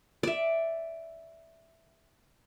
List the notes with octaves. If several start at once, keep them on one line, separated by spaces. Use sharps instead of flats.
D5 E5